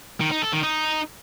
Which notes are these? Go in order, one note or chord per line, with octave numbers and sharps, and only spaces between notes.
D#3
D#4
A4
D#3
D#4